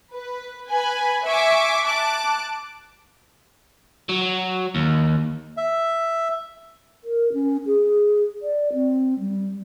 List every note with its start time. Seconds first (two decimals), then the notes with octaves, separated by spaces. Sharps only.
0.14 B4
0.69 B4 G#5
1.26 E5 G#5 C#6 D6
1.86 A5 D6 F#6
4.09 F#3
4.75 D#2
5.57 E5
7.04 A#4
7.33 C#4
7.66 G#4
8.42 D5
8.73 C4
9.20 G3